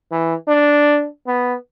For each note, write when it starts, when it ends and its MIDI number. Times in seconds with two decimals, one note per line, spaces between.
0.12 0.34 52
0.48 1.07 62
1.27 1.54 59